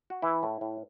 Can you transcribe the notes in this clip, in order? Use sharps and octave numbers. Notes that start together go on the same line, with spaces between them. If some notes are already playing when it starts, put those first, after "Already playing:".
F#4
E3 E4
A2
A2